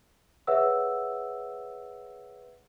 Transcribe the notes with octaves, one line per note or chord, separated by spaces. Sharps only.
G#4 B4 C#5 E5 F#5 E6